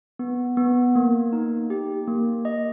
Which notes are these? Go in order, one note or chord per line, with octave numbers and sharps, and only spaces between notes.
B3
B3
A#3
D#4
G4
A#3
D#5